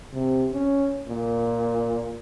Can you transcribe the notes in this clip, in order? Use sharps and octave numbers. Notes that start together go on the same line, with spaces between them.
C3
C#4
A#2